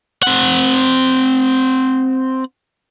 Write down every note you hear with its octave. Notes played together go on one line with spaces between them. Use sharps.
C4 F#5